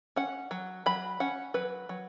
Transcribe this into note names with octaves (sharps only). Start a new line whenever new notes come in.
C#4 F#5
F#3
F#3 B5
C#4 F#5
F#3 B4
F#3